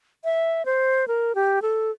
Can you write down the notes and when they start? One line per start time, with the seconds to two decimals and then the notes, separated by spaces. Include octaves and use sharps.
0.24 E5
0.66 C5
1.08 A#4
1.35 G4
1.62 A4